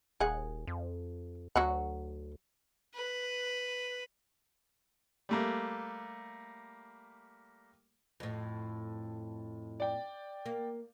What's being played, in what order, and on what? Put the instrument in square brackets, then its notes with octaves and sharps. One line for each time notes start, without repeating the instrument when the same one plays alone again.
[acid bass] D#1 [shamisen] G#4 F#5
[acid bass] F2
[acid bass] D2 [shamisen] F#3 F#4 F#5
[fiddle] B4
[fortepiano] G3 A3 A#3
[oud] F2 A2
[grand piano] D5 G5
[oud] A#3